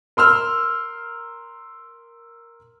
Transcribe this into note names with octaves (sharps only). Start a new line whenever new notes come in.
A#4 C6 E6 F6